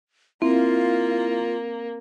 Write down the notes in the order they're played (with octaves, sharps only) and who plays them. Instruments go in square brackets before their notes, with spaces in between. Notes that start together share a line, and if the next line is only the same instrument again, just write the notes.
[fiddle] A#3 [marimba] C4 [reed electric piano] E4 [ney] F4